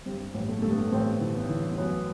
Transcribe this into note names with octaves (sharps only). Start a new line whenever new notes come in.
G2 C4
A1
A3
G2 A3
B3
A1 C4
E3
B3
E3
F#2 B3